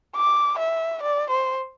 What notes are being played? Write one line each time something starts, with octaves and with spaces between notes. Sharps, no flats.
D6
E5
D5
C5